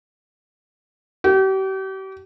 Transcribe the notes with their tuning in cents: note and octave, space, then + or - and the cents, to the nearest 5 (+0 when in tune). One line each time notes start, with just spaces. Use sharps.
G4 -40